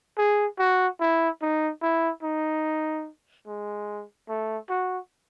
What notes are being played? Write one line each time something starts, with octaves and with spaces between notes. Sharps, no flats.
G#4
F#4
E4
D#4
E4
D#4
G#3
A3
F#4